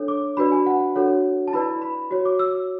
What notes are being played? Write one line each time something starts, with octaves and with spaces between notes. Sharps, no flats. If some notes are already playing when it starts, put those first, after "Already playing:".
Already playing: D4 A4 C#5
D6
D4 F#4 B4 D5 B5
G#5
F#5
D4 F#4 A4 C#5 F#5
A5
E4 B4 D5 B5
B5
F#4 C#5
D6
E6